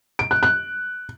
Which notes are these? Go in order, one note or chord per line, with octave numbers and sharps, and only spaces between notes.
D7
F#6
F#6